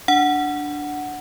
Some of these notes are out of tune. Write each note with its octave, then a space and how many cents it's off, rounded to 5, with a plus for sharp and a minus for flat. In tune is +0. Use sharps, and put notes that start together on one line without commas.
D4 +0 F#5 +0